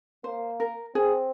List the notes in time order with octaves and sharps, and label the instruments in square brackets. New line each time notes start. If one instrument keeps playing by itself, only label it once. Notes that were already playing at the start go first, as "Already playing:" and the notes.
[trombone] A#3 [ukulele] C5
[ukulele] A#4
[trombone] C4 [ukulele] G#4